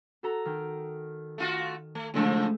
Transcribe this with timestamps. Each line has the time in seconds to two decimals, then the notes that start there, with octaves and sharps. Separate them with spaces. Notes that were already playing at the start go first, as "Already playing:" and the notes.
0.23 F#4 A4 A#5
0.45 D#3 G5
1.38 A3 F4 F#4
1.95 A3
2.14 A2 C#3 F3 G#3 A3